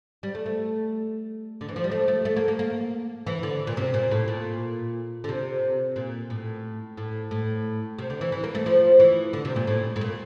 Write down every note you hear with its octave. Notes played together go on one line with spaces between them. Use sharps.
G3
A3
A3
D3
E3
F3
G3
A3
A3
A3
A#3
A#3
A#3
E3
D3
A#2
C3
A#2
A2
A#2
D3
C3
A#2
A2
A2
A2
C3
D3
E3
E3
A#3
A3
F3
E3
D3
C3
A#2
A2
A2
A#2